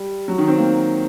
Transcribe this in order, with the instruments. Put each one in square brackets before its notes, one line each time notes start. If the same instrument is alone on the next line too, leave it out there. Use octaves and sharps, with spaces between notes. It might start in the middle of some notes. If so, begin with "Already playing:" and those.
Already playing: [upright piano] G3
F#3
D#3
C4
A#3